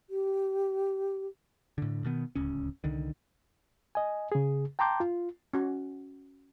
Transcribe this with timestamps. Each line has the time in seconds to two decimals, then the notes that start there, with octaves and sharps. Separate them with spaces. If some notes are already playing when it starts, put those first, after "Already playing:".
0.10 G4
1.78 A2 D3
2.04 B2 D#3 B3
2.35 D1 C#2 C#4
2.84 C2 D3 D#3
3.95 D#5 G#5
4.32 C#3 G#4
4.79 G5 A5 A#5 C6 D6 G6
5.00 F4
5.54 C#4 F#4